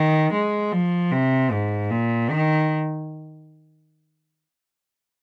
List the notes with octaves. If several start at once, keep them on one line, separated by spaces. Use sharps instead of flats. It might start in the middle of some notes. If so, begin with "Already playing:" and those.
Already playing: D#3
G#3
F3
C3
G#2
A#2
D#3